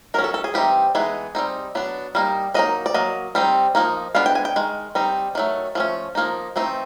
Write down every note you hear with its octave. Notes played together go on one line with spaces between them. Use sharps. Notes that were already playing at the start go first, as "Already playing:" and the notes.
D#3 F#3 C#4 A#4
A4
A4
G#4
E3 G3 C4 D#4 G4
E3 G#3 B3 D#4 G#4
G3 C4 D#4
F#3 B3 D4
G3 A#3 D#4
F#3 A#3 D#4 D#5
D5
F#3 A#3 D#5
G3 C4 D#4
F3 A#3 D#4
G#3 B3 D4 F5
G5
G#5
G5
D#3 G#3
G3 C4 D#4
D#3 F#3 A3
F3 A3 C#4
F3 A#3 D#4
E3 A3 C4 D#4